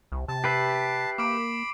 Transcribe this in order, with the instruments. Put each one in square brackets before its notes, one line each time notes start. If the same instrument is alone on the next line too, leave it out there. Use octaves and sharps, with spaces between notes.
[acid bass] C2
[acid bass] C3 [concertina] A5
[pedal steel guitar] G4 B4 E5 [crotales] C7
[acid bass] A#3 [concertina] B5 [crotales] D6 D7